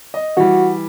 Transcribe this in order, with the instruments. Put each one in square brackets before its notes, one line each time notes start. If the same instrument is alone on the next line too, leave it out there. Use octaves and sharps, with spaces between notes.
[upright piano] D#5
[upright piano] E3 G3 [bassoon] F#4